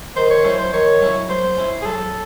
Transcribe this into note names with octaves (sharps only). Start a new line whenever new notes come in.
D#3 C5
C#5
F#3 C#4 E4 C5
C5
D#3 C#5
F#3 C#4 E4
F#3 C5
C#4 E4
G#4
F#3 A4